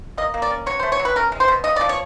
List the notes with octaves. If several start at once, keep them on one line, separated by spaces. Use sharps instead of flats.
A#3 D#5
A#3
D5
C#4
F#3 C#5
A3 C5
C#5
F#3
B4
C#4 A#4
G#3
C5
B2
C#3 D#5
F3 D5
C#5